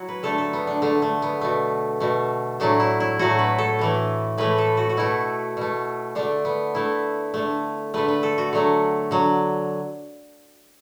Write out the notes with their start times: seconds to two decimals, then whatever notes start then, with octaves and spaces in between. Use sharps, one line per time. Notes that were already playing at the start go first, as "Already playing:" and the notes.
Already playing: F#3 E4 F#4
0.09 B4
0.23 D3 A3 A4
0.38 A4
0.53 B3
0.67 D4
0.82 D3 A3
1.02 A3
1.22 B3
1.41 B2 A3
2.00 B2 A3
2.60 A2 F#3 A3 D4
2.80 E4
3.00 E4
3.19 A2 F#3 A3 F#4
3.39 B4
3.58 A4
3.79 A2 E3 A3
4.38 A2 E3 A3 B4
4.58 A4
4.77 F#4
4.89 F#4
4.97 B2 A3 E4
5.57 B2 A3
6.15 D3 A3 D4
6.45 B3
6.75 D3 A3 E4
7.34 D3 A3
7.94 D3 A3 B4
8.08 B4
8.23 A4
8.38 F#4
8.53 D3 F#3 A3
9.11 D3 F#3